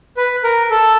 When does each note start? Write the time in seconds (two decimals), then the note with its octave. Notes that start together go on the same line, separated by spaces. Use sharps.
0.17 B4
0.44 A#4
0.71 A4